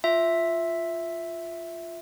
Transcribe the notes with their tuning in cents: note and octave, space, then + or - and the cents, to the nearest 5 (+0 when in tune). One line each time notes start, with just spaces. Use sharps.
F4 +0 E5 +0